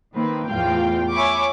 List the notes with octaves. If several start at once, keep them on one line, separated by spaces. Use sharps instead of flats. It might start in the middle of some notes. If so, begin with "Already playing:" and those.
D#3 A#3 C4 B4
E2 A2 F4 F5 G5
C#5 E5 G#5 B5 C#6 D6